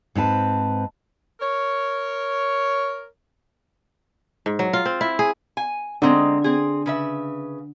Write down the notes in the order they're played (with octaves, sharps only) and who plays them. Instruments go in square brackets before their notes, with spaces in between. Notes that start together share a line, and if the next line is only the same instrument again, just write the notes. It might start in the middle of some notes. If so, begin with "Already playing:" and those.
[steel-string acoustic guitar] G#2 C4 B4 A5
[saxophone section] A#4 C#5
[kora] G#2
F#3
F4
C4
E4
G#4
[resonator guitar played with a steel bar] G#5
[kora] D3 [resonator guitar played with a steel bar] G#3 C4 D#4
[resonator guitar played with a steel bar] C4 G#4
C#3 B4 E5